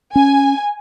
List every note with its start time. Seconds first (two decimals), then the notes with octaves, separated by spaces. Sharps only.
0.15 C#4 G#5